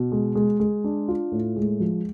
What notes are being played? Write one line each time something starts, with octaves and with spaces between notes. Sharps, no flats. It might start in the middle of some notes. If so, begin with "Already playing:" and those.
Already playing: B2
G#3
G#3
G#3
D4
F4
A2
G#3
F3